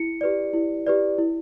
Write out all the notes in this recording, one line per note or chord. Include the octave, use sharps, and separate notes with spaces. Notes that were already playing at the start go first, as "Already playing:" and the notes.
Already playing: E4 C#7
G4 B4 D5
E4
G4 B4 D5
E4